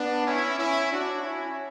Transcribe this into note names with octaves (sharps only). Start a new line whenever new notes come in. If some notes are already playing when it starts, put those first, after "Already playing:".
Already playing: B3 D4
C#4 E4
C#4 E4
D4 F#4
C#4 E4